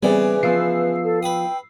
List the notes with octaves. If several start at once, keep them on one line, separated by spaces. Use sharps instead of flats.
C#3 E3 G3 B3 C4 G#4 B4 D5
F3 B3 E6 C7
A4
B4 G5 D#6